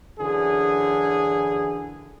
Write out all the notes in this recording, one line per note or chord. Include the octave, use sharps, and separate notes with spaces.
F#2 D3 E3 G#4